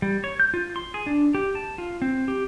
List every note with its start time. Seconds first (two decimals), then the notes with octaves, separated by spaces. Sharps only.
0.02 G3
0.24 C#5
0.40 G6
0.54 F4
0.76 C6
0.94 G#4
1.06 D4
1.35 G4
1.55 A5
1.78 F4
2.02 C4
2.28 G4